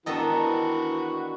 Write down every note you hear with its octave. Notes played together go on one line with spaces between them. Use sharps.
D#3 E3 B3 D4 F#4 A4 D#5